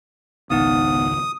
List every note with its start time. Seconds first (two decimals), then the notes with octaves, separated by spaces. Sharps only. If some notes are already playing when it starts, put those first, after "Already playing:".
0.50 G#1 C#2 B3 D#4 F#5 D#6